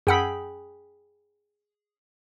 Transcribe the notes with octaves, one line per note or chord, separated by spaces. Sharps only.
F#2 G#4 F#5 G5 B5 E6